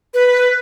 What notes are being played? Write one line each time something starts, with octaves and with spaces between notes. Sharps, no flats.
B4